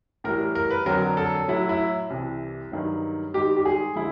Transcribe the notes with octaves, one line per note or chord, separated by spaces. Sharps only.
A2 E3 G3 A#4
A#4
B4
F2 D3 F#3 A#4
A4
A2 F#3 E4
E4
C2 C3 E3
G2 D#3 F#3
G#2 D#3 G3 G4
G4
G#4
D3 F3 G#3 E4